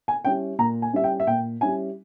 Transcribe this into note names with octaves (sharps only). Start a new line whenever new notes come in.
G#5
G3 C#4 E4 G5
A#2 A#5
G#5
G3 C#4 E4 E5
G5
E5
A#2 G5
G3 C#4 E4 G#5